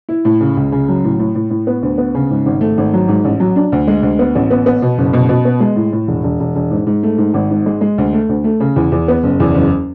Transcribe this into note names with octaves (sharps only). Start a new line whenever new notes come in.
E4
A2
C#3
C#2
C#3
F#3
A2
A2
A2
A2
B3
D2
B3
C#3
G#2
G#1
A3
G#1
F#3
G#2
A1
F#3
D4
D2
G#3
D2
B3
A1
B3
B3
B2
F#1
B2
B2
B3
G#3
A2
A2
E1
E1
E1
E1
G#2
G#2
A3
G#2
G#1
G#2
G#3
G#3
D2
A3
D2
A3
C#3
E2
E2
B3
F#1
E2
F#1